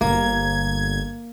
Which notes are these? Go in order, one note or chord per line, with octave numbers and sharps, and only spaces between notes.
G1 A#3 G#6